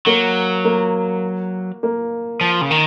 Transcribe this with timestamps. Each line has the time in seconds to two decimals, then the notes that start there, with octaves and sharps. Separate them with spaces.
0.06 F#3 A#3
0.65 A#3
1.83 A#3
2.41 F3
2.61 C#3
2.71 D#3